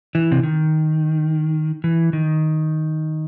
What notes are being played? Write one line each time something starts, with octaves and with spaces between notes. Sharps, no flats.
E3
C3
D#3
E3
D#3